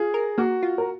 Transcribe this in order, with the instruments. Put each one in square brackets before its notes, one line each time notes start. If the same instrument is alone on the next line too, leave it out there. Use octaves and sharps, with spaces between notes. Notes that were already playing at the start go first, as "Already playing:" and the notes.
Already playing: [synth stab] F4 [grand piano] G#4
[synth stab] A#4
[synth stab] A#3 [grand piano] F#4
[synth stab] F4
[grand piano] A#4